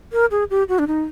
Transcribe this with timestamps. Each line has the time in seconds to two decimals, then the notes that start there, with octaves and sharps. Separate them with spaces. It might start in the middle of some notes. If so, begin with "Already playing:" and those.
0.13 A#4
0.31 G#4
0.50 G4
0.69 F#4
0.79 D4
0.87 D#4